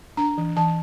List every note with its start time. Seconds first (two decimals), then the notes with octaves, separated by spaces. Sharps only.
0.17 D4 A#5
0.38 E3
0.57 E3 A5